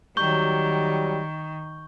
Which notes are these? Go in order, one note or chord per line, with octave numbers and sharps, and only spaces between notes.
D#3 F#3 G3 C#6 G6 G7